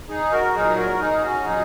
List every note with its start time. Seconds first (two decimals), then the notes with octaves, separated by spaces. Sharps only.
0.09 D#4 G#4
0.32 F#4 A#4
0.54 A#2 F#3 D#4 G#4
0.76 F#4 A#4
0.99 D#4 G#4
1.21 C#4 F#4
1.44 A#2 F#3 D#4 G#4